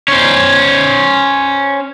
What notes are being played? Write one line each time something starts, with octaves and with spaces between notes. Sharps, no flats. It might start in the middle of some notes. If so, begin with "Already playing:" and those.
C#4 C5